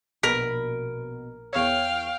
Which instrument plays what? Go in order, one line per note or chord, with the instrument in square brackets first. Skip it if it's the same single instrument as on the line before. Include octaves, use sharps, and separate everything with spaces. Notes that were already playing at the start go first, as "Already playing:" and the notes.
[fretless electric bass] A#1 [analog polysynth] B2 [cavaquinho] A#4 B5
[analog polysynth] E2 C#5 [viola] F5 G5